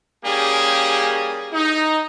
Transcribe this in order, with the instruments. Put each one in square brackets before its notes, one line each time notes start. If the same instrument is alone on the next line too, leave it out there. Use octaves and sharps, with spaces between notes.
[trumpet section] G3 A#3 C#4 G4 G#4
D#4